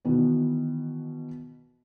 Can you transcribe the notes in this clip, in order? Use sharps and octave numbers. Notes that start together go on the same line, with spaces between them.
B2 D#3 E3 B3